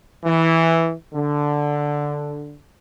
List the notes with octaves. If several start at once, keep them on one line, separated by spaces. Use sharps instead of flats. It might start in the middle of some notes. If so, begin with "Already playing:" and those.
E3
D3